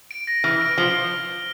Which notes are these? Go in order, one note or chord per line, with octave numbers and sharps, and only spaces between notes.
D7
A#6
E3 F6
D7
F3 G7